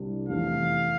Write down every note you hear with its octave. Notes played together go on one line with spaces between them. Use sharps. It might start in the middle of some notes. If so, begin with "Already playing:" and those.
Already playing: C2 C3 G3 D4
F1 E2 C3 E3 A3 F5